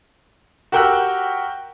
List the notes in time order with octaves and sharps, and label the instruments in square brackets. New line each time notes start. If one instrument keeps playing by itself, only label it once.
[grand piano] F#4 G4 A#4 G5 E6 F#6